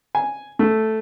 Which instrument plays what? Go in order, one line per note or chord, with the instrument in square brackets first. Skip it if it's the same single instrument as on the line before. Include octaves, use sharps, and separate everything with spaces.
[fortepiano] G#5
A3